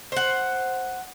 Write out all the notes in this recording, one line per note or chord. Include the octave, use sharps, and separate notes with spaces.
C5 F#5